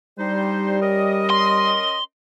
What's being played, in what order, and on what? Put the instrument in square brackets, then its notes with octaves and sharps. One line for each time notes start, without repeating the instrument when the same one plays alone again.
[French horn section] G3 [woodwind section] D4 D#4 C5
[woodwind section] C#4 A#4 D#5
[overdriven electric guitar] C6